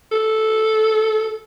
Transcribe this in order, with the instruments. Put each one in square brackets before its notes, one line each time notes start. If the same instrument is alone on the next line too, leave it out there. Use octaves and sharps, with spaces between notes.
[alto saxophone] A4